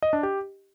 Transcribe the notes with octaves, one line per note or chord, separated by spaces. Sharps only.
D#5
D4
G4